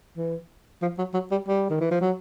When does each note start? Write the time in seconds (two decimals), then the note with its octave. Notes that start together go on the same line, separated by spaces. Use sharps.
0.17 E3
0.82 F3
0.99 F#3
1.14 F#3
1.32 G3
1.48 G3
1.70 D#3
1.81 E3
1.91 F3
2.01 F#3